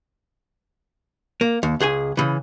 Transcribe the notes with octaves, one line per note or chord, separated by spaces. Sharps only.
A#3
D#2
C#2 G#4 G5 G#5
C#3 E3